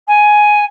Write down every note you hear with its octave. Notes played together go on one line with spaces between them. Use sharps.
G#5